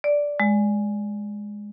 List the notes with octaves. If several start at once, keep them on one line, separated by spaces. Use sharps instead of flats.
D5
G#3